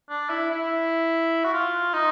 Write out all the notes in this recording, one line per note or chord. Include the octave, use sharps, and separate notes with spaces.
D4
E4
E4
F#4
F4
D#4